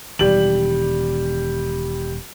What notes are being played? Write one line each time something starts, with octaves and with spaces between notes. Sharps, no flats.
E1 D#3 G3 F#7